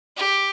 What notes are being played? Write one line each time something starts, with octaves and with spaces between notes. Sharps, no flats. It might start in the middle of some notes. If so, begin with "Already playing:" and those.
G4